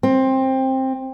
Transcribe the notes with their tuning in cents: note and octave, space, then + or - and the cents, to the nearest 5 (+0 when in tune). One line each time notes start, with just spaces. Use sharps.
C4 +15